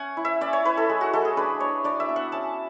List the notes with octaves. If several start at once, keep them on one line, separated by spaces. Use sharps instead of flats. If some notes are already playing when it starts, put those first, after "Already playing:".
Already playing: C#4 F#5 G#5
E4
E5
C#4 D5
C#5
E4 B4
A4
G#3
F#4
G#3 A4
G#4
D4 B4
D4 C#5
D4 D5
E5
B3
F#5
C#4 A5